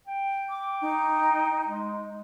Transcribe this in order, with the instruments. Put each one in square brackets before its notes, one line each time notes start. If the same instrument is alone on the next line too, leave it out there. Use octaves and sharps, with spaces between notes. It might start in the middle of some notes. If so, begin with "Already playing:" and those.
[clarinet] G5
[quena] D6
D#4
[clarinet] G#3